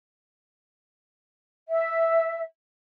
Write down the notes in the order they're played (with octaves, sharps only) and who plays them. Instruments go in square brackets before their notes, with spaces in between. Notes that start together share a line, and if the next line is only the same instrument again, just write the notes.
[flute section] E5